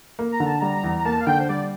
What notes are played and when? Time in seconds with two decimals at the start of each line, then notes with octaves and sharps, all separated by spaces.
0.19 A#3
0.33 A#5
0.40 D3
0.46 A5
0.61 G3 A#5
0.84 E2
0.99 A#5
1.05 A#3 A5
1.21 F5
1.27 D3 G5
1.40 C5
1.49 G3 D5